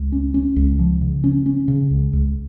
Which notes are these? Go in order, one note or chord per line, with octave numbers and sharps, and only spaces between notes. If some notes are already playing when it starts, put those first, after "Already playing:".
Already playing: C#2
C#4
C#4
C#2
F3
C#3
C#4
C#4
C#3
C#2
C#2